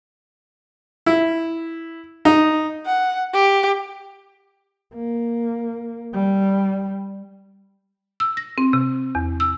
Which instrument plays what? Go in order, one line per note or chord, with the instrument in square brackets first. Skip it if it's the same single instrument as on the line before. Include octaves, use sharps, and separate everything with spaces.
[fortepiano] E4
D#4
[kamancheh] F#5
G4
[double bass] A#3
G3
[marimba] E6
A#6
C4
C3
E2
E6